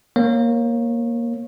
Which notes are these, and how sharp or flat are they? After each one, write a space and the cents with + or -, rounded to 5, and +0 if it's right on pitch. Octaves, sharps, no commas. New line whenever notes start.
A#3 +10 C#5 -20